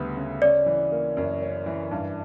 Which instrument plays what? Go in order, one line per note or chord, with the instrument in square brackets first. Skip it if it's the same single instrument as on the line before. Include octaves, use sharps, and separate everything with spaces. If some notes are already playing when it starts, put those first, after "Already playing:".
Already playing: [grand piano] D2 C#3 G3 B3
C#3
[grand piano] C#4 [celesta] D5
[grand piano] E3
A#3
F#2
C#4
E3
G2